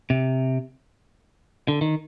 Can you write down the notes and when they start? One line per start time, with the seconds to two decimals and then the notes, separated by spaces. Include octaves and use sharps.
0.10 C3
1.68 D3
1.81 D#3